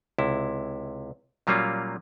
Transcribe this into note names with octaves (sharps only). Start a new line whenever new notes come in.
C#2 C3 E4
A#2 F#3 G3 A#3 C#4 F4